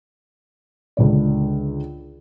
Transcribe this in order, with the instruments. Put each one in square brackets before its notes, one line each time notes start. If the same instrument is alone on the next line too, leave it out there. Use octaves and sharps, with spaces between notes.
[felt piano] C#2 D3 D5